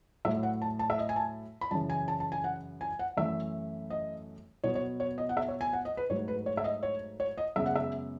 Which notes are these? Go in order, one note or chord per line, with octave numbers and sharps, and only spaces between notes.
A2 F#3 A3 E5
F#5
A5
A5
E5
D#5
G#5
A5
B5
F#2 C#3 E3 A5
G#5
A5
A5
G#5
F#5
G#5
F#5
F#2 E3 A3 E5
D#5
B2 F#3 B3 C#5
C#5
C#5
D#5
F#5
E5
C#5
G#5
F#5
D#5
B4
G#2 F#3 A3 C#5
B4
C#5
E5
D#5
C#5
C#5
D#5
F#2 C#3 G#3 B3 E5
F#5
E5